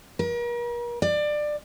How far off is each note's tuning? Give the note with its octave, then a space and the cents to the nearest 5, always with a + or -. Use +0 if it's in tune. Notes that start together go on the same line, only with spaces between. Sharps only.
A#4 +40
D5 +20